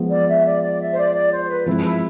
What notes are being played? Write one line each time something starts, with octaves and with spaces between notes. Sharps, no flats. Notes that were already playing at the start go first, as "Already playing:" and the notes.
Already playing: F3 G#3 B3
D5
E5
D5
D5
E5
C5
D5
D5
C5
B4
F3 G#3 C4 E4
E4